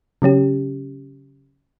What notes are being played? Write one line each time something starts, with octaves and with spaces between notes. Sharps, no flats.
C#3 F#3 C#4 G4